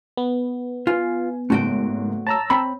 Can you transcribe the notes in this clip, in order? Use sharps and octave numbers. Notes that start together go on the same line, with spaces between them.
B3
F4 B4 G#5
F#1 G#2 A3 F#4 G5
C#5 A5 A#5 E6
C4 B5